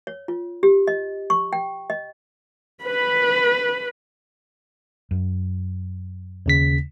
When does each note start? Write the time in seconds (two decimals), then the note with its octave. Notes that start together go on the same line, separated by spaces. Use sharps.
0.07 C#5
0.28 F4
0.63 G4
0.87 D#5
1.30 C#6
1.53 G5
1.90 D#5
2.84 B4 B5
5.11 F#2
6.46 D#2 C#3 B6